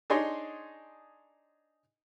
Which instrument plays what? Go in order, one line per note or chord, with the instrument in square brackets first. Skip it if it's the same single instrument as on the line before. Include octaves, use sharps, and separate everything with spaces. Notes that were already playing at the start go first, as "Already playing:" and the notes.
[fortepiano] D4 D#4 G#4 C#5 D#5 C6